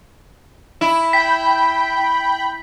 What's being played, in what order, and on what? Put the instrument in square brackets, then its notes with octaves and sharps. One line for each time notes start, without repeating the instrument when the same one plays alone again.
[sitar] E4
[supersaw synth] G5 B5 [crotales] B6